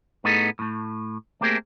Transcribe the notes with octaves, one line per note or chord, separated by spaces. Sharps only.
A2 A3 B3 D#4 G#4 A4
A2 A3
A3 A#3 C4 G4 G#4 A#4